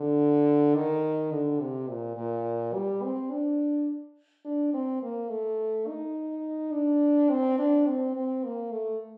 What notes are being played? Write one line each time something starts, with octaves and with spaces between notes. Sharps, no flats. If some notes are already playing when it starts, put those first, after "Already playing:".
Already playing: D3
D#3
D3
C3
A#2
A#2
G3
C4
D4
D4
C4
A#3
A3
D#4
D4
C4
D4
C4
C4
A#3
A3